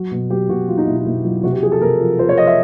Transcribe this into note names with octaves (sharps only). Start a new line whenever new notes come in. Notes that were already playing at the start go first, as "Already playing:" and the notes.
Already playing: F#3 F#4
B2
F#3 G4
B2 F#4
F#3 F4
D#4
B2 E4
D#4
B2 E4
F#3 F4
C3 F#4
G4
F3 G#4
A4
C3 A#4
F3
F3 C5
C#5
F3 D#5
E5